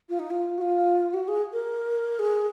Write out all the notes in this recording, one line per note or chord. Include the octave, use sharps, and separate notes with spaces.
F4
D#4
F4
F#4
F4
F#4
G#4
A#4
G#4